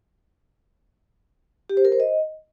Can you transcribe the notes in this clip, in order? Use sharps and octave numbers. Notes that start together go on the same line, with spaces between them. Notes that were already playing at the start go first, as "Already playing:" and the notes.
G4
C5
A#4
C5
D#5